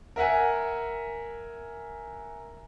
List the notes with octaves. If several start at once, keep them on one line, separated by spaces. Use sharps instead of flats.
A#4 E5 F#5 G#5